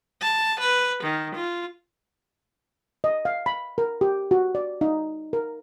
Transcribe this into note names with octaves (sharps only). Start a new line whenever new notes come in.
A5
B4
D#3
F4
D#5
F5
B5
A#4
G4
F#4
D5
D#4
A#4